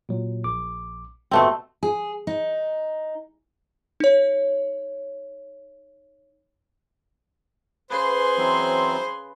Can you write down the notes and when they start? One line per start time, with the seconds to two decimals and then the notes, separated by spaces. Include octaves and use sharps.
0.09 A#2 F#3
0.44 A#1 D6
1.31 G1 B2 A3 C4 B4 C#6
1.83 G#4
2.27 D#4
4.00 D#4 C#5
7.90 C#3 G#4 B4 C5 C6
8.38 E3 F#3 C4